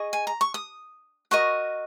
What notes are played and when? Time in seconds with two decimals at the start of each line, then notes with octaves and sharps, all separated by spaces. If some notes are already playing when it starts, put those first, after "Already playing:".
Already playing: G#4 D#5 C#6
0.13 G#5
0.27 A#5
0.41 C#6
0.54 D#6
1.31 F#4 A#4 D#5 C#6